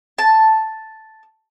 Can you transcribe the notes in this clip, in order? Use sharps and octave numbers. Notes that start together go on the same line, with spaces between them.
A5